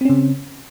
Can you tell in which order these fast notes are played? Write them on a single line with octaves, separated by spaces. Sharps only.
C4 C#4 C#3